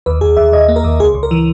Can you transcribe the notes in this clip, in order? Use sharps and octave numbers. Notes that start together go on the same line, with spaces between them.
D#2 B4
D#2 G#4
D#2 E5
D#2 D#5
A#3
A#4
D#2
C#2 G#4
C#2
A#4
E3